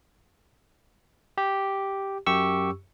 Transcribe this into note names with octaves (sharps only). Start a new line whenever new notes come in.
G4
F#2 G4 C#6 E6